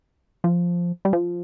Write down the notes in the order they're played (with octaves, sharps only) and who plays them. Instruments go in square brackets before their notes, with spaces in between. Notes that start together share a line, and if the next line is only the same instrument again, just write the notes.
[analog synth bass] F3
G3
F3